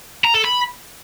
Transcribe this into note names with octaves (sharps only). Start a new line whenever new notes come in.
A#5
A4
B5